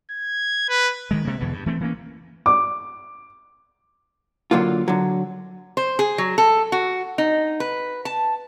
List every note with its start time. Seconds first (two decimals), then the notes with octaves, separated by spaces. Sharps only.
0.11 G#6
0.70 B4
1.11 G2 D#3 G#3
1.25 C3 G#3 A#3
1.40 E2 B2 D3 E3
1.53 G2
1.66 E3 A3 C4
1.80 E3 A#3 C#4
2.46 D6
4.51 D3 F#3 A#3 F4
4.88 D3 F#3
5.77 C5
5.99 G#4
6.18 F#3
6.38 A4
6.72 F#4
7.18 D#4
7.60 B4
8.05 A5